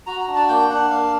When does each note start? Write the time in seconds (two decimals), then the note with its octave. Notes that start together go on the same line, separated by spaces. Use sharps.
0.07 F#4 A#5
0.21 A#5
0.28 D4
0.35 A5
0.49 A#3 G5
0.70 D4 F#5
0.90 A#3 F5